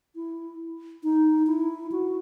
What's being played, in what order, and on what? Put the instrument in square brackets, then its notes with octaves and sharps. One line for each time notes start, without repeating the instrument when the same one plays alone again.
[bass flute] E4
D#4
E4
F#4